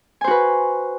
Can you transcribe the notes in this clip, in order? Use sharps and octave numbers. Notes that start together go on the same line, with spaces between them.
F#4 B4 C5 G#5